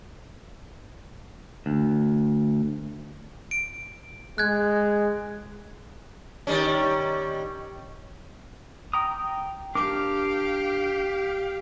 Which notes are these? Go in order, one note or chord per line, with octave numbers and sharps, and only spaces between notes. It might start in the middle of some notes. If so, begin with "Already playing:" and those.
D2
D7
G#3 F#6 G#6
D#3 G3 C#4
G5 A#5 D#6
D4 G4 A#4 F5 D6